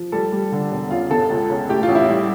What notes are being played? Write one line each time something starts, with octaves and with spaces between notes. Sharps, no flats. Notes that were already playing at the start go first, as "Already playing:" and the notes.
Already playing: F3
G3 A4
G3
D3
E1
C#3 F4
G1 A4
C#2
C#3
A2 G4
F4
A1
E4
G3